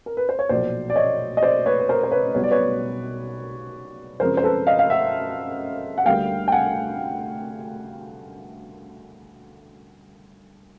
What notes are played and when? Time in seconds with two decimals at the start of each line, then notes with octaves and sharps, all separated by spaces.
0.06 A#4
0.17 B4
0.29 C5
0.39 C#5
0.49 B1 A#2 F3 C5 D5
0.90 D5
0.96 C#5 D#5
1.37 D#5
1.43 C5 D5
1.66 B4 C#5
1.80 B4
1.89 A#4 C5
2.03 C5
2.11 B4 C#5
2.35 B1 B2 G3 B3 C#5
2.43 D5
2.51 B4 C#5
4.20 F#2 C#3 F3 G#3 C4 A#4 C5
4.37 C5
4.43 A4 B4
4.67 D#5 F5
4.79 F5
4.90 E5 F#5
5.98 F#5
6.06 D2 D3 G3 A#3 F5 G5
6.48 G5
6.52 F#5 G#5